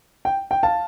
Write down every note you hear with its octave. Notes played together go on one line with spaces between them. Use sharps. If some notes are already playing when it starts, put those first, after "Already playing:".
G5
G5
F5 A5